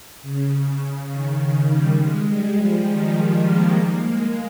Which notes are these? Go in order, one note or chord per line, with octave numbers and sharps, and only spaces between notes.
C#3
C#3
C#3
D#3
G3
G#3
G3
F3
D#3
G#3
A#3
A#3
G#3